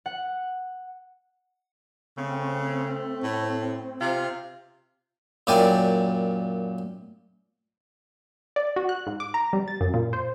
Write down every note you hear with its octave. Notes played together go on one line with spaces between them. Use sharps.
F#5
C#3 A3 C4
A2
C3 F4
F#2 A#2 E4 D5 G5 G#5
D5
F#4
F#6
G#2
D6
A#5
G3
A6
F#2
A#2
C5